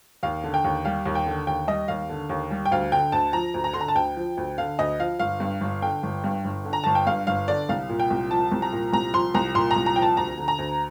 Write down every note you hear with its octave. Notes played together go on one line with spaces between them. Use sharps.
D#2 F5
D3
G5
D#2
G3 F5
D#2
G5
D3
D#2 G5
G3 D#5
D#2 F5
D3
D#2
G3
G5
D2 F5
D3 G5
D2 A5
F3 A#5
D2
A#5
D3 C6
A#5
A5
D2 G5
F3
D2
D3 F5
D2 D#5
F3 F5
G1 F5
G2
G1
D3 G5
G1
G2
G1
D3
A#5
G1 A5
G5
G2 F5
G1 F5
D3 D5
C2 F5
A#2
G5
C2
F3 A5
C2
A#5
A#2
C2 A#5
F3 C6
C2 A#5
A#2 C6
A#5
C2
A#5
F3 G5
A5
D2 A#5
D3
A#5
D2